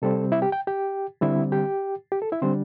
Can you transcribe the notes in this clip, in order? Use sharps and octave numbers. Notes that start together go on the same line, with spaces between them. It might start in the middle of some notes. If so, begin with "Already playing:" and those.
C3 G3 C4 A4
E4 E5
G4 G5
G5
G4 G5
D3 G3 C4 E4 E5
G4 G5
G4
A4
E4 E5
D3 G3 C4 D4 C5